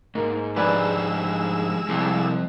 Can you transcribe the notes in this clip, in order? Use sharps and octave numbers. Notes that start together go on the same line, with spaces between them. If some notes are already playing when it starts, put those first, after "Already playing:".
G#2 A#3
F3 G#3 D4 G4 B4 D5 G#5 E6
C2 F3 C4